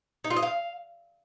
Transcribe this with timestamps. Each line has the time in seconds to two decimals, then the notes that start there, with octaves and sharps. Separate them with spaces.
0.24 D#4
0.30 F4
0.36 D#5
0.42 F5